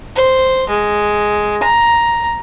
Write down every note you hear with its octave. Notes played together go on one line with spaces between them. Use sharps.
C5
G#3
A#5